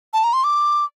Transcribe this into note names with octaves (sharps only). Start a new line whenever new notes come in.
A5
A#5
C6
D6